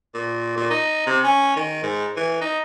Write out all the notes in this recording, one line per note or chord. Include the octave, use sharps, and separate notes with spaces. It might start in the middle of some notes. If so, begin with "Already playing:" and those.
A#2
A#2
D#4
C3
C#4
D#3
G#2
E3
D#4